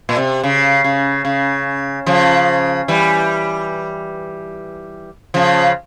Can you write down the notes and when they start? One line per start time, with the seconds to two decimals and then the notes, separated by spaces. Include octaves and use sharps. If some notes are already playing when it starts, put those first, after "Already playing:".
0.09 A#2
0.16 C3
0.44 C#3
0.84 C#3
1.25 C#3
2.06 C#3 F3
2.88 E3 G3
5.34 C#3 F3